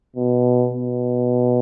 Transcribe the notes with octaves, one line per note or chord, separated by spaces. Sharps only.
B2
B2